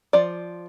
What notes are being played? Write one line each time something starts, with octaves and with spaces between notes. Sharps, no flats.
F3 D5